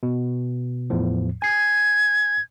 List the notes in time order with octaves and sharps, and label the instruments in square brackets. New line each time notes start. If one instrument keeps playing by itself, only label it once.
[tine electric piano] B2
E2 A2 F3
[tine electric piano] G#5 C7 [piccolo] G#6